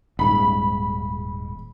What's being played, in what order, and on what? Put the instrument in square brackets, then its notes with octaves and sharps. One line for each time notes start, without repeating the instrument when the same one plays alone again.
[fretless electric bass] D#1 G#2 [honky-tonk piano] B5